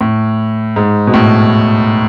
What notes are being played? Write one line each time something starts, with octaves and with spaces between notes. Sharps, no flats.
A2
G#2
B2
A2